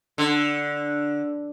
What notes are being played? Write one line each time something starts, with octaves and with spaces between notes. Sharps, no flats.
D3